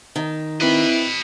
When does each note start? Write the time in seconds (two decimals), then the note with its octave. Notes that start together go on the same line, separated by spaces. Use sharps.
0.16 D#3
0.61 C4 E4 B4 D#5 B5 F#6